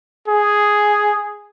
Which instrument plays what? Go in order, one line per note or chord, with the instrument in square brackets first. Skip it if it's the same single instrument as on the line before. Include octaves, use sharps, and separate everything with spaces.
[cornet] G#4